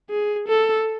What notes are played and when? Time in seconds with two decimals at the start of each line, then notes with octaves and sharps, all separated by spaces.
0.10 G#4
0.48 A4